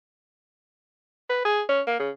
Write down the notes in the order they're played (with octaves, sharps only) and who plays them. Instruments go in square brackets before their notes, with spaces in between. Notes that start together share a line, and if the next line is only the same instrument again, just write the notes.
[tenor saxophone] B4
G#4
C#4
A#3
C#3